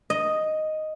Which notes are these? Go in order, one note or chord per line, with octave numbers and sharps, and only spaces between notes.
D#5